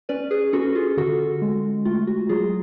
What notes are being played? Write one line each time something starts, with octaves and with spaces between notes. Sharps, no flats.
C#4 B4 D5
G#4 B4
C#4 F#4 A4
F4 G#4
D3 F#4 A4
G#3
A3 F4
F#4
F#3 F4 G#4